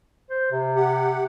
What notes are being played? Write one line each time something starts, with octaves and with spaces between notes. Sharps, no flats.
C5
C3
G4 F#5